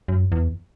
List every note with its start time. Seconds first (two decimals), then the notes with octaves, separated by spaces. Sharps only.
0.08 F#2
0.32 E2